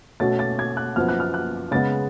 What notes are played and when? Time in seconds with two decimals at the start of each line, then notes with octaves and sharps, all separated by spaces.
0.20 B2 A3 C#4 A6
0.39 A6
0.59 G#6
0.77 F#6
0.96 F#2 F3 B3 F6
1.09 F#6
1.20 F6
1.34 F#6
1.71 C#3 G#3 B3 A6